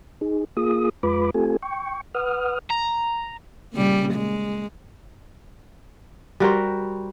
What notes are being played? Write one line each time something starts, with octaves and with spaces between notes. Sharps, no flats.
D#4 G#4
A#3 F4 G#4 D#6
F2 G#3 F4 B4 B5 D6
A3 C4 F4 G4 A4 G#5
G5 C#6
B4 F#5 D#6 F6
A#5
A#2 C#3 G3
G#3
G3 F#4 A#4 C5